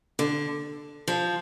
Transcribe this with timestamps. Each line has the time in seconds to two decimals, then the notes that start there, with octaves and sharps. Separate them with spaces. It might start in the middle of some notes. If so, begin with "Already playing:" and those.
0.19 D3
1.08 F3